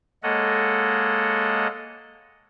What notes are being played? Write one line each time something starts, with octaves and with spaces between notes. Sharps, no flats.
G#3 A#3 A4 C#5 D#5 F#5